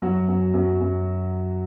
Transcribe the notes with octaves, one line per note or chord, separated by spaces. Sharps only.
F#2 F#3 F#4
F#2
F#2
F#2